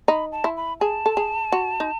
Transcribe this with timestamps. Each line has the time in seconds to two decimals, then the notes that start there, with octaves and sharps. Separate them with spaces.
0.08 D#4 B5
0.32 A5
0.44 E4
0.57 B5
0.80 G#4 A5
1.06 A4
1.17 G#4
1.52 F#4
1.80 D#4